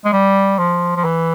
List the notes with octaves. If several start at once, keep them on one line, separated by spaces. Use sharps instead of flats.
G#3
G3
F3
F3
E3